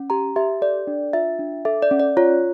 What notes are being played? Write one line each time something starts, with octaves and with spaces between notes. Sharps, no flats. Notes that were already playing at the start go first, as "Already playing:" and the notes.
Already playing: C#4
G4 A#5
G4 E5
A4 D5
D4
F4 E5
D4
A4 E5
D5
C#4
D5
F4 C#5